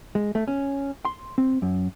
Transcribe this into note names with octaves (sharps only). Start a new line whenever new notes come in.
G#3
A3
C#4
C6
C4
F#2